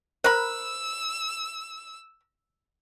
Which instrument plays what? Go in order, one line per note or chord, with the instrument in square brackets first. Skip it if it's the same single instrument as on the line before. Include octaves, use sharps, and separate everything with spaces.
[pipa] A#4 B5 [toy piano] C5 [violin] E6